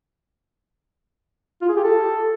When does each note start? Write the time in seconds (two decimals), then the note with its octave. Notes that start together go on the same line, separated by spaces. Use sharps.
1.62 F4
1.69 G#4
1.76 G4
1.83 A4